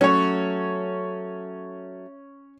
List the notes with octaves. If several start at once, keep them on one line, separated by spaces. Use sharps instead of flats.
F#3 A3 C#4 C#5